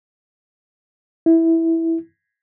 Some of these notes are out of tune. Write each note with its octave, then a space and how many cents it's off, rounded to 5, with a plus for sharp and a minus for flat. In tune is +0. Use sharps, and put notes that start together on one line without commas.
E4 -5